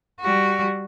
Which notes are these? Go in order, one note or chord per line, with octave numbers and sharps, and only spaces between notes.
G3 F#4